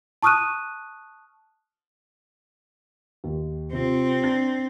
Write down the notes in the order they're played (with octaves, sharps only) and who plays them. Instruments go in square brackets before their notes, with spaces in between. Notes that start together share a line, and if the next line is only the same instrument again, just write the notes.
[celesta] A5 C#6 D#6 F6 F#6 D#7
[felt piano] D#2
[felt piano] C3 F4 [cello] C4
[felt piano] D4 A6